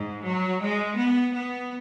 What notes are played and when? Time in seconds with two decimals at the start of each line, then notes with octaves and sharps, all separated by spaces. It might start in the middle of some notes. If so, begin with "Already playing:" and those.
Already playing: G#2
0.25 F#3
0.61 G#3
0.98 B3
1.34 B3